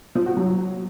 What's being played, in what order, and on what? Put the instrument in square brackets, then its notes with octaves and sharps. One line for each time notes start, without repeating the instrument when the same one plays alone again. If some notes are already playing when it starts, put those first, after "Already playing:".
[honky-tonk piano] F3
F#4
F#3